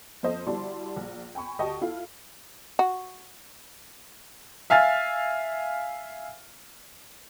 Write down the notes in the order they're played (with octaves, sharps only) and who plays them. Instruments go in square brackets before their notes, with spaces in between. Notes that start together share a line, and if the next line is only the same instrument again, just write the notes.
[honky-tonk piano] F2 A4 C5 D#5
G3 E4 F#4 D5 A5 C6
A#1
G5 G#5 B5 C#6
D2 G4 D#5 G5 A5 C#6
E4 F4 A4 F5
[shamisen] F#4
[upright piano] E5 F5 G#5 F6 A6